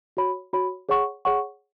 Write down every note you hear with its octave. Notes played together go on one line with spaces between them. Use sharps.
F#4 C#5 B5
F#4 C#5 B5
G#4 C#5 F#5 C#6
G#4 C#5 F#5 C#6